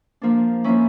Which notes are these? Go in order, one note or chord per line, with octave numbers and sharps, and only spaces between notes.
F3 A#3 D4
F3 A#3 C#4 E4